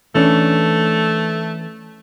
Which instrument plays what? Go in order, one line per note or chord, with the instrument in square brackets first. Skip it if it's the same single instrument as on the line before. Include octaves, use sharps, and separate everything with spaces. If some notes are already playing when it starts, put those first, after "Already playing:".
[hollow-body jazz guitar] E3 C#4 D4 [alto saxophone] A3